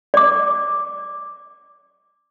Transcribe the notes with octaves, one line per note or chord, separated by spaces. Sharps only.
D5 D6